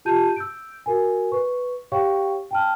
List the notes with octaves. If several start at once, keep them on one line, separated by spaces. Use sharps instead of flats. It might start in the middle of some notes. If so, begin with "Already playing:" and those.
F4 G4 A5 G6 D#7
E6 G6 D7
F#4 A#4 G#5
B4 C#6
G4 C#5 F5 G5 C#6
G5 A5 F6